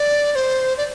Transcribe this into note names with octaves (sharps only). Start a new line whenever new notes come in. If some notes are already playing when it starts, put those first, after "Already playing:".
Already playing: D5
D5
C5
D5